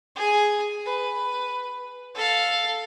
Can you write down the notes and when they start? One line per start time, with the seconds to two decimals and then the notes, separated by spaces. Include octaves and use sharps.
0.16 G#4 G#5
0.85 B4
2.15 A4 F5